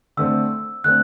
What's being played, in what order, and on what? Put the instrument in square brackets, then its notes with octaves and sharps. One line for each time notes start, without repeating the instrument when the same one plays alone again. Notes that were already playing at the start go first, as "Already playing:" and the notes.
[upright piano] D3 A3 C4 [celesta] E6
[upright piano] D3 A3 C4 [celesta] F#6